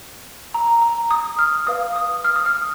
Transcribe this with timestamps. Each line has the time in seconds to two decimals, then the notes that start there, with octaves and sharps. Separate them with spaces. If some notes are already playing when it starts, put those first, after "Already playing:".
0.54 A#5
0.82 A#5
1.11 D#6
1.39 F6
1.67 B4 F5 D#6
1.96 D#6
2.24 F6
2.36 D#6
2.46 F6